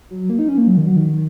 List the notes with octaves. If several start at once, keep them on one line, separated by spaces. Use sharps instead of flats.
F#3
A#3
D#4
C#4
A#3
F#3
D#3
F#3
D#3